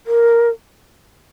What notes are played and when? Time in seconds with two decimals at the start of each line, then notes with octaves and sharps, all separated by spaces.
0.06 A#4